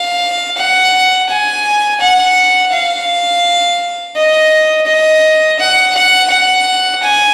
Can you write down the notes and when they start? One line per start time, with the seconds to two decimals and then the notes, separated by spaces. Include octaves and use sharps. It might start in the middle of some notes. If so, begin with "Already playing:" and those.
Already playing: F5
0.57 F#5
1.29 G#5
2.00 F#5
2.73 F5
4.16 D#5
4.87 D#5
5.59 F#5
5.95 F#5
6.30 F#5
7.03 G#5